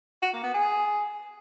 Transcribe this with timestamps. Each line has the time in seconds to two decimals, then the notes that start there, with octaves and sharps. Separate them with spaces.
0.22 F#4
0.33 A#3
0.43 B3
0.54 G#4